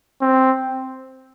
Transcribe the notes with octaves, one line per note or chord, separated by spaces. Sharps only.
C4